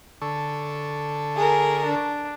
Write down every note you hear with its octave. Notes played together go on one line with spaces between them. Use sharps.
D3 A4 C#6
G#4 A#4
D4